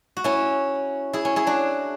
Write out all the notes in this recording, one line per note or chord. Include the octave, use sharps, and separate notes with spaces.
F#4
C#4 E4
E4 G#4
C#4
E4 G#4
D4 F#4